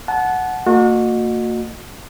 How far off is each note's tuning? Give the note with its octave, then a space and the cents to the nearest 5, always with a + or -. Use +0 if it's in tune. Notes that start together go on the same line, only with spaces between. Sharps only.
F#5 +0 A5 -30
A#3 -40 F#4 -35 D#5 -25